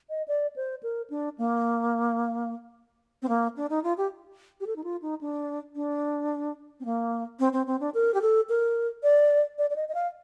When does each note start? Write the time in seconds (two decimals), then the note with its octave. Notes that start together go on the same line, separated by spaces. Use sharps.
0.10 D#5
0.28 D5
0.56 C5
0.83 A#4
1.10 D4
1.38 A#3
3.22 C4
3.29 A#3
3.57 D4
3.70 D#4
3.84 F4
3.97 G4
4.60 G4
4.67 A4
4.76 D#4
4.84 F4
5.02 D#4
5.21 D4
5.75 D4
6.80 C4
6.85 A#3
7.40 C4
7.53 C4
7.67 C4
7.80 D4
7.94 A#4
8.14 G4
8.21 A4
8.49 A#4
9.03 D5
9.58 D5
9.70 D5
9.76 D#5
9.89 D#5
9.95 F5